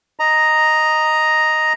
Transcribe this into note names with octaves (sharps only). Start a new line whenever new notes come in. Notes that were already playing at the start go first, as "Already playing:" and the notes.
D#5 A#5